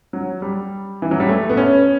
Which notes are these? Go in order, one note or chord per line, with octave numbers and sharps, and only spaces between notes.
F#3
G3
E3
F#3
G3
A3
B3
C#4